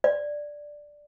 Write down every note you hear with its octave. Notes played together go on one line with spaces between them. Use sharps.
D5